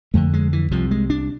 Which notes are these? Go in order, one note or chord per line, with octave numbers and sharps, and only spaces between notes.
F2 D3 A3
G#3
E3
C2 C3 F3
G#3
D4